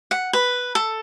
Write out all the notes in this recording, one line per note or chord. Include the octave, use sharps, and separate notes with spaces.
F#5
B4
A4